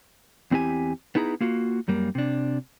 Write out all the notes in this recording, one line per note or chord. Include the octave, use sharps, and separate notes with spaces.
E2 C4 E4 G4 G#5
B3 D#4 E4 G#4 A5 A#5
A#3 F4 F#4
F#2 G3 A#3
C3 D4